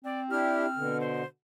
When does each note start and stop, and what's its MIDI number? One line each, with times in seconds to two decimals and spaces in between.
0.04 0.96 60
0.04 0.21 74
0.31 0.66 62
0.31 0.66 64
0.31 0.66 67
0.31 1.00 89
0.76 1.23 47
0.76 1.23 50
1.01 1.26 72